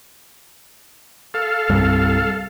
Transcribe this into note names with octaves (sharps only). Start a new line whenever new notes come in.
A4 F5
C2 G2